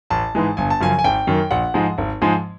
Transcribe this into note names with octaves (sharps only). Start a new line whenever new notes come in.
A1 A5
G#2 E3 G#3
G1 G#5
A5
F#2 C#3 F3 G#5
G#5
G#1 G5
F#2 D#3
A#1 F#5
G#2 F3 G#3
G#1
G#2 F3 G#3